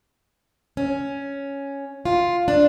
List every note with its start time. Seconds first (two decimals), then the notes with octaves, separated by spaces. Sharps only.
0.77 C#4
2.05 F4
2.48 D4